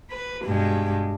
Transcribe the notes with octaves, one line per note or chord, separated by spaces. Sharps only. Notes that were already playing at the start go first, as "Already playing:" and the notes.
B4
G2 B2 G#3